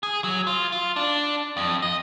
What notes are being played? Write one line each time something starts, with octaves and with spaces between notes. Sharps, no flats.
G#4
F#3
F4
F4
D4
F2
D#5